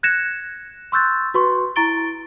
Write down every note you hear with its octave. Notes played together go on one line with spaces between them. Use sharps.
F#6 G#6 A#6 C#7 E7
C6 C#6 E6 F#6 G6 A6
F#4 B4 C6 C#6
E4 A#5 C#6 A6 D7 G7